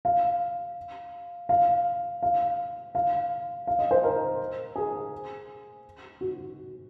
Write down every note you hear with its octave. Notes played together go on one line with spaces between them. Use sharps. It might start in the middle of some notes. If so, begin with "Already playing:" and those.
F5
F5
F5
F5
F5
D#5
C5
A#4
G#4
F#4